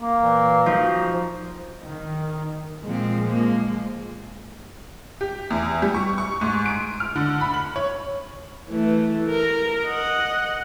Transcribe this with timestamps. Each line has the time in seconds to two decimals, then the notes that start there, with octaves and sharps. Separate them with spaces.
0.02 A#3
0.21 A#2 E3
0.66 F3 D#4 F#4
1.84 D#3
2.84 A#2 F3 G#3 C4
3.27 A#3
5.21 G4
5.50 E2
5.82 G3
5.95 C#6
6.18 C#6
6.41 G#2
6.66 D7
7.00 F6
7.16 D3
7.41 B5
7.54 F#7
7.76 C#5
8.69 E3 A3
9.29 A#4
9.84 D#5 F#5